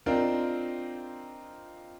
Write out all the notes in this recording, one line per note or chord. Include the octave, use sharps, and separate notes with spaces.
C4 D4 D#4 F4 A#4